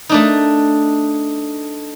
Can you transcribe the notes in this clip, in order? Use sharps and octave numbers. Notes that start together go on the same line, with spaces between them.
A3 D4 D#4